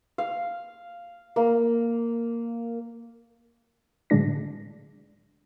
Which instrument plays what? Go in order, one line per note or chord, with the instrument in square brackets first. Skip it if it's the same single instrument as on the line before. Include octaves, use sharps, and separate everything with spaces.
[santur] F5
A#3
[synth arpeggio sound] A2 D3 F#3 G#3 D4 A#6